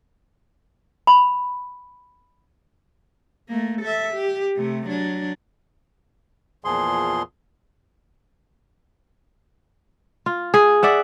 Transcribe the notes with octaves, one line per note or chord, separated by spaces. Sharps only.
B5
A3 A#3
A4 E5
G4
C3 A3
F#3 D4
E2 A#2 F3 G#4 C6
F4
G#4
D5 E5 F#5